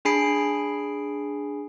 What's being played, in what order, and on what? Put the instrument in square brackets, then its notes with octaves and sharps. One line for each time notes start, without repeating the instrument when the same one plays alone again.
[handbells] D4 G#4 G#5 B5 C7 D7